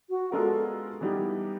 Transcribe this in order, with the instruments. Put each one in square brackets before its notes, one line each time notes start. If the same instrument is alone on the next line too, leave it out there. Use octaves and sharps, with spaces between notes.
[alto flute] F#4
[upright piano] G#3 B3 D4 F4 A#4 [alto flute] A4
[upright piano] E3 G3 B3 D#4 G4